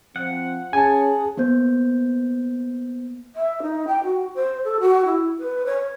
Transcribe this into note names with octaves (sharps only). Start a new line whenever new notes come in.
F3 C4 F#5
C#4 G#4 G#5 A5
A#3 B3 C5 G6
E5
D#4
G5
F#4
C5
A4
F#4
E4
B4
C#5